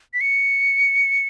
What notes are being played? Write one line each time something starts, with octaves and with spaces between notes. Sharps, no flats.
B6
C#7